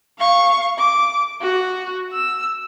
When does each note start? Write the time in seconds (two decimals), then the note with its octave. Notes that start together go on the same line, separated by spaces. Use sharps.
0.19 F5 C#6
0.78 D6
1.41 F#4
2.12 E6